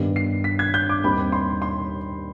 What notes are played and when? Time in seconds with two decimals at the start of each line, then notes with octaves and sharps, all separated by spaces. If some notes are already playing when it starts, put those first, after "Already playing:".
Already playing: G2 D#3 B3
0.16 C7
0.44 B6
0.59 G#6
0.74 G6
0.89 D6
1.04 D#2 D#3 G3 C4 B5
1.32 C6
1.62 C6